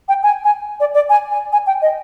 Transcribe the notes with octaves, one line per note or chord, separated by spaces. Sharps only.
G5
G#5
G#5
D5
D5
G#5
G#5
G#5
G5
D#5